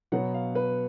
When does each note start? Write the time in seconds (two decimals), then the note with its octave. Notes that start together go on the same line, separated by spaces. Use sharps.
0.12 B2 F#3 B3 F#5
0.34 F5
0.55 B4